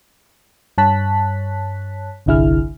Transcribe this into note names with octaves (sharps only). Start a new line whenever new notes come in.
G2 C#5 A5 F#6 B6
G1 C2 D3 E4 G#4 F6